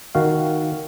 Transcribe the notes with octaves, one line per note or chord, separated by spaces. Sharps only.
D#3 F#4 F5